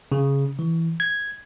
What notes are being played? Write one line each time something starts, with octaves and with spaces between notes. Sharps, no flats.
C#3
E3
G#6